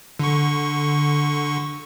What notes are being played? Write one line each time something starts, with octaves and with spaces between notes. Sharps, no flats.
D3 C#6